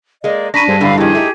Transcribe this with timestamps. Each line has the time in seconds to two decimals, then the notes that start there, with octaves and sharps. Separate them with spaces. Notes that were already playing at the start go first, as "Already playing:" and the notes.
0.24 G#3 A#3 D5 D#5
0.54 D4 A#5 B5 C#6 A#6 B6 D#7
0.68 G2 G#4 A4 C5
0.81 F#2 A2 D3 D5 F5 B5
0.98 F2 D#3 E4 G4 G#4
1.15 A3 D#4